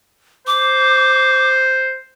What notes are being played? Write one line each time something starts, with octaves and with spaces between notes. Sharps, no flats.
C5 D6